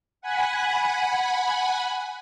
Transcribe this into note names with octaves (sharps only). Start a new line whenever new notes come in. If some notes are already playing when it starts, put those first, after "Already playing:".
F#5 G#5 B5